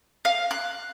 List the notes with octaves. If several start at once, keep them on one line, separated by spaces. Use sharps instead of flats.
F5
F#6